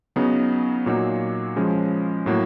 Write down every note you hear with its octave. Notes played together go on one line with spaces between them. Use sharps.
C#3 F#3 B3 D#4
A#2 F#3 A#3 D#4 F#4
C#3 F3 G#3 C#4
A2 F#3 A#3